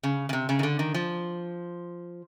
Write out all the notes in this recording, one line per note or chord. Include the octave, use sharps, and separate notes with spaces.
C#3
C#3
C3
C#3
D#3
D3
D#3
F3